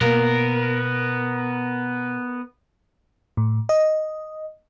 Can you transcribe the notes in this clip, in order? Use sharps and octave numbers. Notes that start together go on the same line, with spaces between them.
B2 A#3 B3 A#4
A2
D#5